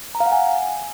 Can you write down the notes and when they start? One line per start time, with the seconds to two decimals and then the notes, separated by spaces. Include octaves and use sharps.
0.15 A#5
0.20 F5
0.26 F#5
0.32 G#5